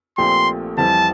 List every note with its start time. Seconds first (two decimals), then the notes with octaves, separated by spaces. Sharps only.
0.18 A#1 A#2 A3 C4 G4 C6
0.77 F2 E3 G3 C4 A5